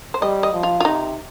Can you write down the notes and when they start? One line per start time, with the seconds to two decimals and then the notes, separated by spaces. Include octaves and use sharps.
0.14 C5
0.21 G3 D#5
0.43 D#5
0.53 F3
0.63 F4
0.80 F4
0.85 C3 D#4